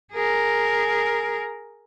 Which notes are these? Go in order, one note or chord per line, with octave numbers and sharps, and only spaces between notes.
G#4 A#4